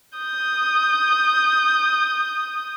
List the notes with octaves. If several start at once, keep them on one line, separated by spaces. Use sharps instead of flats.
D#6 G6